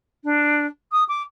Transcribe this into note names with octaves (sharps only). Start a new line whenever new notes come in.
D4
D#6
D6